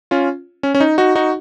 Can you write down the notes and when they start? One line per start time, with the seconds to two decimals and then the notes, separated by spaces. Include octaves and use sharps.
0.11 C#4 F4
0.63 C#4
0.75 C#4
0.80 D#4
0.98 D#4 F#4
1.15 D#4 F#4